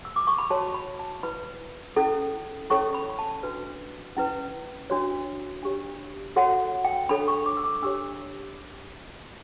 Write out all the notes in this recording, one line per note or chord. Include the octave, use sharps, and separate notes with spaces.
E6
D6
C#6
B5
F#4 C#5 A5
B5
A5
E4 B4 B5
C#4 E4 A4
C#4 E4 A4 C#5 C#6
B5
B5
A5
D4 F#4 B4
C#4 E4 B4
D4 F#4 C#5
D4 G4 C#5
F#4 A4 C#5 F#5
G5
D4 A4 C#5 B5
C#6
D6
E6
D6
D4 G4 C#5 E6